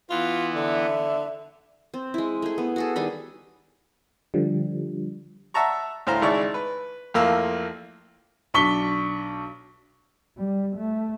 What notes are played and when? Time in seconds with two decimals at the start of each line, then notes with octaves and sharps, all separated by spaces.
0.10 E3 B3 F4
0.55 D3 E5
1.94 C4
2.14 G#3 E4
2.42 A3 G#4
2.58 B3
2.76 F#4 G#4 A4
2.96 D#3 G3 G#4 B5
4.34 D3 F3 G3
5.54 E5 F#5 A5 A#5 C#6
6.07 D2 A2 C5 F5 A#5
6.22 G#1 C#3 E4 D5 C#6
6.54 B4
7.14 A1 F2 A#3 F5 E6
8.54 B1 D4 C#6 B6 G7
10.38 G3
10.76 A3